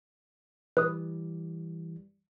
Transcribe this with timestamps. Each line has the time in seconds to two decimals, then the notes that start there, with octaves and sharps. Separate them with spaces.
0.77 E3 G3 B4 D#6